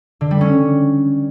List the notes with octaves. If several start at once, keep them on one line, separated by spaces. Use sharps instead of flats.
D3
G3
C#4